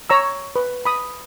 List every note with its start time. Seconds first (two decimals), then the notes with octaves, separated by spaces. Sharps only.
0.10 C#5 A#5 E6
0.56 B4
0.85 B5 D#6